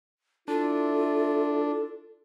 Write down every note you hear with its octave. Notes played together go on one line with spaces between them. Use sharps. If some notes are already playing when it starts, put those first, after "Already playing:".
D4 E4 F4 A4